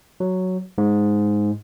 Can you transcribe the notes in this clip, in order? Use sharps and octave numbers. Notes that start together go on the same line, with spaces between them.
F#3
G#2